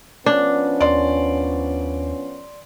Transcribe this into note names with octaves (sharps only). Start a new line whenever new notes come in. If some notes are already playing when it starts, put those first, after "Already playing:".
F3 B3 C#4 D4
D#2 D5 C6